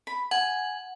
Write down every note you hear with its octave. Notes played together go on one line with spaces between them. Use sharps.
B5
F#5 G#5